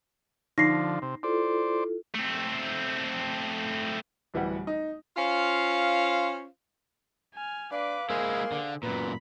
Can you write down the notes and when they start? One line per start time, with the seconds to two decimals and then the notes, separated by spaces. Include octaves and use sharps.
0.58 D3 F3 D#4 A#6 C7
1.02 C3
1.23 E4 F4 A4 C5 D5
2.15 A3 C4
4.34 D1 E3 G3 F#5
4.67 D#4
5.17 C#4 F4 C5 F5
7.34 G#5 F6
7.72 D4 B4 F5 D6
8.10 G#3 A#3 E4 G#4 C5
8.52 D3
8.83 F#2 A#2 B3 B5